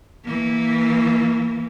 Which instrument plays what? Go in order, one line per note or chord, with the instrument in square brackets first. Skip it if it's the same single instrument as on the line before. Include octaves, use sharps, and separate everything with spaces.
[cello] E3 A#3